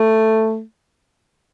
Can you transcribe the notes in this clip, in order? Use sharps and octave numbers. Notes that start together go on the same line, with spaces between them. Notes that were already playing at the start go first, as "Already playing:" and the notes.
Already playing: A3